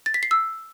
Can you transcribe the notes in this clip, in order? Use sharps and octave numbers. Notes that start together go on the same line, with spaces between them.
A6
B6
C7
E6